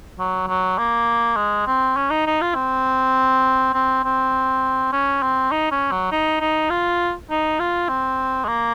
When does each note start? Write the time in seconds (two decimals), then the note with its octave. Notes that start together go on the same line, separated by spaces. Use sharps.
0.19 F#3
0.47 F#3
0.78 A#3
1.36 G#3
1.66 C4
1.97 C#4
2.11 D#4
2.26 D#4
2.41 F4
2.55 C4
3.74 C4
4.04 C4
4.92 C#4
5.22 C4
5.51 D#4
5.71 C#4
5.91 F#3
6.12 D#4
6.41 D#4
6.70 F4
7.30 D#4
7.59 F4
7.89 C4
8.44 G#3
8.48 A#3